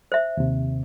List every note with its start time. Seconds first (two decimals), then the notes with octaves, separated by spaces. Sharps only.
0.12 C5 E5
0.37 D#2 C3